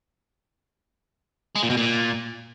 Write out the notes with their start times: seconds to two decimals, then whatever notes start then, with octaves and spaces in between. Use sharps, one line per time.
1.56 G#3
1.63 A#2
1.70 B2
1.77 A#2